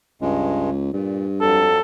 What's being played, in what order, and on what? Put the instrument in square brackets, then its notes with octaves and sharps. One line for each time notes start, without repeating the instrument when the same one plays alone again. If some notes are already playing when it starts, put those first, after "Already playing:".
[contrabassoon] C#2 [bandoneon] G2 G#3
[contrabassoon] G2 [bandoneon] A#2
[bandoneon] F2 F#3 [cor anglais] A4